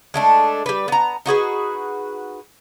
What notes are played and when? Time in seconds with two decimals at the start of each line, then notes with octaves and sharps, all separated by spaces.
0.14 G#3 A3 D4
0.66 G3 B4
0.88 B3 A#5
1.26 D#4 F#4 G#4 B4